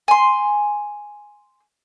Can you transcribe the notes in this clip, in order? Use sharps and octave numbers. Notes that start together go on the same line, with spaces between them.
G#5 C6